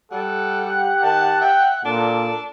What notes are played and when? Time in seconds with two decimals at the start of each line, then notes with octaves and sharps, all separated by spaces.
0.12 G3 A4 F#5
0.64 G4
1.03 D#3 A5
1.41 E5 G5
1.85 A#2 D4 A4